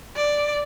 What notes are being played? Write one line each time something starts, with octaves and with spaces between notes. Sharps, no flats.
D5